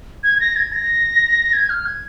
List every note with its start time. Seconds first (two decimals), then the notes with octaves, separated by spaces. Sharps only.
0.24 G#6
0.36 G#6
0.40 A#6
0.56 G#6
0.73 A#6
1.53 G#6
1.70 F6
1.86 G#6